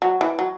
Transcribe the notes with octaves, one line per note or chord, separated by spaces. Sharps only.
F#3
E3
F#3